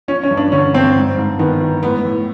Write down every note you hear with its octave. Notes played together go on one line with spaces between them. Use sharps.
F3 C#4
C#4
G2
D4
D3 C#4
G2 C4
G#2
G#2
D#3 B3
D#3
A2 B3
A2